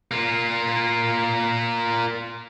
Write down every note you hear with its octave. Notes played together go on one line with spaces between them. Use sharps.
A#3 F4